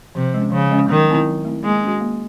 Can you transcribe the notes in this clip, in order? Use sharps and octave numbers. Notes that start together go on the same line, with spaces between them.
C3 F3
G#3 C#4
C#3 F3
G#3 C#4
D#3 F#3
A3 C4 E4
F#3
A3 C4 E4
G#3 A#3
C#4 F#4
A#3